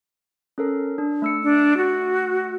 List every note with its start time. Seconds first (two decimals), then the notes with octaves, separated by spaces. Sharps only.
0.58 C#4 A4 A#4
0.98 D4
1.22 A3 E6 C#7
1.43 D4
1.77 F#4